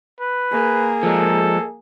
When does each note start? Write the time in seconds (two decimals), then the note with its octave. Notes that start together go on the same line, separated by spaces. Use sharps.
0.20 B4
0.52 A#3 G#4
1.03 F3 G#3 A4